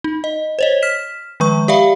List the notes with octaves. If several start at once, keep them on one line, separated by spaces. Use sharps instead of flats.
D#4
D#5
C5 C#5 D#5
F6 B6 E7
D#3 F3 G#3 B4 C#6
G4 D5 E5 F5 B5